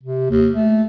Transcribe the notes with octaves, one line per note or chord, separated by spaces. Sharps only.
C3
D#2
A3